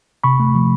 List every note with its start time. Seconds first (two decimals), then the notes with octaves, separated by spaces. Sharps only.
0.24 C3 B5 C#6
0.40 A3
0.55 F3